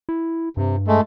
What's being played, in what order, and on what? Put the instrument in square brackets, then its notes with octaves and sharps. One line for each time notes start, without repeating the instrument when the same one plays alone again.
[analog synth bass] E4
[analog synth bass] G2 [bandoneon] C3
[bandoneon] G#3 A3